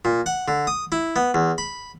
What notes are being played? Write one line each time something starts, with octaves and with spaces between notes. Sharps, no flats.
A#2
F#5
D3
D#6
E4
B3
E2
B5